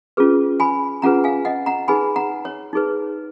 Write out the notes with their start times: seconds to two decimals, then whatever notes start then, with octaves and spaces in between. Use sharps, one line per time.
0.17 C#4 F4 G#4 B4
0.60 G#5 B5
1.02 C#4 F4 G#4 B4 F#5 A#5
1.24 F5 G#5
1.45 D#5 F#5
1.66 F#5 A#5
1.88 D#4 G#4 B4 G#5 B5
2.16 F#5 A#5
2.45 C#5
2.73 D#4 G#4 B4